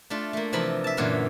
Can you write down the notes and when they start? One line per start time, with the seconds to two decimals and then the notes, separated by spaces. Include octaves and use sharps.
0.10 A3 D4 F4
0.33 A3 A#3
0.53 C3 E3 F3 A#4 B5
0.84 E5 A5
0.97 F#2 A#2 D3 E3 B4 F5